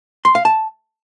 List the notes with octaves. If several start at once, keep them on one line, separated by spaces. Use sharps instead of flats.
C6
F5
A5